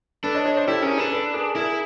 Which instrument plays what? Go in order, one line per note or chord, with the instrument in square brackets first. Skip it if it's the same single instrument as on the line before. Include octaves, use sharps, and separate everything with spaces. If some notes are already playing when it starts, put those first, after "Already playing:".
[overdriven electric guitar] D4 [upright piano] A4 B4
[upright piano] C#5 D#5
C#5 D#5
C5 D5
[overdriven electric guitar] E4 [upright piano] G4 A4
[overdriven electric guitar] C#4 [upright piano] G#4 A#4
[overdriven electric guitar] D4 [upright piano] A4 B4
[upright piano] A4 B4
G#4 A#4
[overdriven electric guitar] E4 [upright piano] G#4 A#4